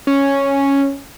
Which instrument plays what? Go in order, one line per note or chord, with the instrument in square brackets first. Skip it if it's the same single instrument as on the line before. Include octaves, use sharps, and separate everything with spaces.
[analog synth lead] C#4